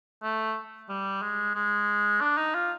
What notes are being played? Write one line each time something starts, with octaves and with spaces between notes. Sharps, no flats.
A3
G3
G#3
G#3
D4
D#4
F4